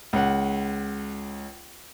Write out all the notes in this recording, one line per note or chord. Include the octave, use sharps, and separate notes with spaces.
C#2 F#5